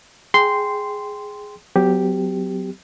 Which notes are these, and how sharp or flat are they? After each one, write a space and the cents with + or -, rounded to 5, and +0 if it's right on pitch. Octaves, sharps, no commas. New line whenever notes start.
G#4 +0 G5 +0 C6 -10
F#3 +0 B3 +45 G4 +0